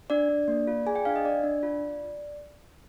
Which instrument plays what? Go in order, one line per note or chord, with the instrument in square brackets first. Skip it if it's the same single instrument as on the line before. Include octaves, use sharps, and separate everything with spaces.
[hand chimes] D4 D5
D4
A#3
F4
G#4 G#5
G5
D4 F5
D#5
D4 D5
D4
F4